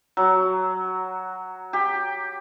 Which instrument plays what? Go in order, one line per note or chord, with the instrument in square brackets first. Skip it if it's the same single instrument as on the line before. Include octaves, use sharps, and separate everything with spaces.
[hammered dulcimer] F#3
G4